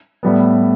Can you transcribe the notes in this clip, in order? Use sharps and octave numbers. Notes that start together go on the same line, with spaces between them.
A2 G3 B3